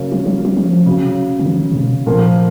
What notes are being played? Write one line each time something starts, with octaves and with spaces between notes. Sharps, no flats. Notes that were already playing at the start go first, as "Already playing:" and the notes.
Already playing: C#3 F#3 A#3 C#4
F3
F#3
F#3
F3
C#3 F#3 C#4
C#3
D#3
A#2
B2
A#2 F3 A#3